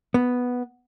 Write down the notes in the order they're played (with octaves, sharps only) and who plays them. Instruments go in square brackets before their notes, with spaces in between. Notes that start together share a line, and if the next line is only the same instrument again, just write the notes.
[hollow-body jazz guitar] B3